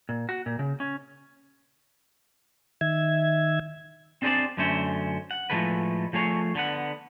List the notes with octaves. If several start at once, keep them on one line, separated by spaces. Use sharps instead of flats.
A#2
F#4
A#2
C#3
C#4
D#3 E5 G#6
C4 D4 G#4 B4 C5 D5
F#2 D3 A3 C#4 C5
F#5
A2 F3 F#3 G#3 A3 B4
F3 A3 G#4 C#5
D3 B3 F#5